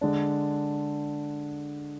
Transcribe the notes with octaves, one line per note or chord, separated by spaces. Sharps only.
D3 G#3 D4